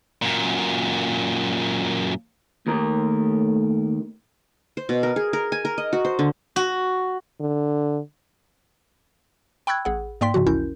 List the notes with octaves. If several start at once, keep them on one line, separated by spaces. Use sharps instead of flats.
F#2 A#2
D#2 A3 A#4
C5
B2
A#4
G#4
A#4
G#5
A#4
D#5
F#4
C5
D3
F#4
D3
G5 B5 C#6 E6 F#6 G#6
A1 G#4 F#5
G#2 A#3 D5 G5 C6 B6
G#2 C#3 F3 F#4
A1 D#2 C#4 E4 A#4 G6